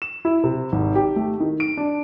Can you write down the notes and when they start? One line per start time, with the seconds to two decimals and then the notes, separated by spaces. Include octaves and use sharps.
0.02 E7
0.25 E4
0.44 C3
0.72 G#1
0.95 G4
1.16 A3
1.40 D#3
1.60 D7
1.77 D4